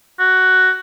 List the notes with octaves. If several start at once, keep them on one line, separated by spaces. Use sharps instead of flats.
F#4